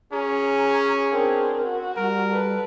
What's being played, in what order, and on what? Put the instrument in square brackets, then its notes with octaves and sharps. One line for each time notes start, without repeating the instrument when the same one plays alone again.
[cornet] C#4 [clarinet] G#4 [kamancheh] A#5
[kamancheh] C4 D4 [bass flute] A#4
[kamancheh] F#4
[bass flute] G3 [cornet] A#4
[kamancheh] A4 B4